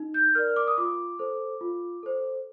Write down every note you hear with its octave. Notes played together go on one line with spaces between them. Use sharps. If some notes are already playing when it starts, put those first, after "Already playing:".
Already playing: D#4
G6
A#4 D5 F6
D6
D#6
F4 D6
A4 C5
F4
A4 C5